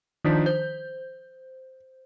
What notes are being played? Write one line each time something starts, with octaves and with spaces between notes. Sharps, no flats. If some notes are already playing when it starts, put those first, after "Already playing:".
D#3 F3 D4 D#4 G6 B6
C5 G6